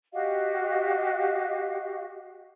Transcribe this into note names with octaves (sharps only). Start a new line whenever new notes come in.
F#4 G4 D#5 F5